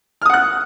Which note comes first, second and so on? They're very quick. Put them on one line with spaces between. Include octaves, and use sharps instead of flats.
F6 D#6 F#5 F#6